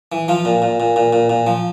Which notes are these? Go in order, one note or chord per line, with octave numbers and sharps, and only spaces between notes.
E3
F3 F4
A#2
A#2
A#2
A#2
A#2
A#2
F3